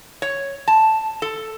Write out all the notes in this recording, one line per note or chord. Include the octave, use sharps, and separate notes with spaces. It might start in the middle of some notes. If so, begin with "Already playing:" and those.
C#5
A5
A4